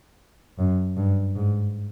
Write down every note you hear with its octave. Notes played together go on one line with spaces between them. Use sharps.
F#2
G2
G#2